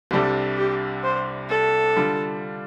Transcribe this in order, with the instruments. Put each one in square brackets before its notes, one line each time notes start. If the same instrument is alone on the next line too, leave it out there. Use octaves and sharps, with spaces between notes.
[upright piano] C2 C3 G3 D4 A4 [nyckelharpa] G4
[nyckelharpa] G4
C5
A4
[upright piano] D3 G3 D4 F4